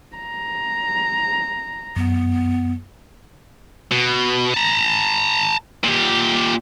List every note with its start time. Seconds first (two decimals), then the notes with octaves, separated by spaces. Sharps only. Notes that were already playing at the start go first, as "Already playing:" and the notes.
0.16 A#5
1.96 F#2 B3
3.92 B2
4.54 A5 A#5
5.84 A#2 G4